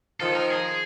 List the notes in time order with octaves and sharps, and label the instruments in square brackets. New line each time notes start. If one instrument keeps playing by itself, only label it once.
[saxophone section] D#3 F3 [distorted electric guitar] A4
[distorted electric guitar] A#4
G#4